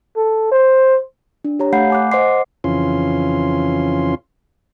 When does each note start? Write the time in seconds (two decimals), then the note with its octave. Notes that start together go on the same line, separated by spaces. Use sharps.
0.16 A4
0.51 C5
1.44 D4
1.59 G4 C#5 A#5
1.72 A3 F5 F#5 B5 G6 C7
1.90 G#5 D6 F#6
2.11 C5 D#5 F#5 C6 D6 C7
2.64 F2 C#3 E3 C#4 F4 C6